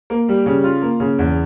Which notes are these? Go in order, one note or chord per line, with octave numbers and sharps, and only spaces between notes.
A#3
G3
C#3
F4
A#3
C#3
E2